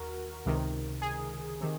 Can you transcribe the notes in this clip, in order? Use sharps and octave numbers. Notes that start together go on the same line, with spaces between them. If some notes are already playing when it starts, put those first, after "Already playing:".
Already playing: D#2 F#4 A#4
C#2 C3 D#3
G#4
C3 D#3